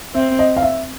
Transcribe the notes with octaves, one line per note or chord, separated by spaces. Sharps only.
C4 E5
D#5
F5
E5